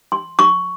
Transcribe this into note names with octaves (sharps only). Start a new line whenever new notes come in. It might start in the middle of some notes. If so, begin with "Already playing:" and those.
C6
C#6